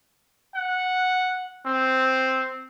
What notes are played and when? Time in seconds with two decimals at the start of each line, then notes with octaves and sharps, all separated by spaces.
0.55 F#5
1.66 C4